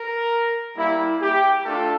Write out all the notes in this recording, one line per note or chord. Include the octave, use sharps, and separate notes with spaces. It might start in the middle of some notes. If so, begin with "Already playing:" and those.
Already playing: A#4
G3 A#3 E4
G4
A3 D4 F4 A4